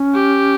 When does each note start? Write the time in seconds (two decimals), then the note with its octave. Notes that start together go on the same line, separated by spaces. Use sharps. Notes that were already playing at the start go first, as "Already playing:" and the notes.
Already playing: C#4
0.15 G4